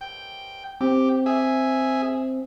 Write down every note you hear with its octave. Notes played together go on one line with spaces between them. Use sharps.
G5
C4 G4
G#4 E5